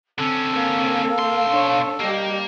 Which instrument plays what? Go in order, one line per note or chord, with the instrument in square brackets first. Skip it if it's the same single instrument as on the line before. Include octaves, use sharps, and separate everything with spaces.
[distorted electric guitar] D3 C#4 [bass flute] C4 [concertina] A4
[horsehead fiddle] A#3
[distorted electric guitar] B1 C6 [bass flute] F5
[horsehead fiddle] D4 C#5
[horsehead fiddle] G3 G4 [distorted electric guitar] A#3 [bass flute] D#5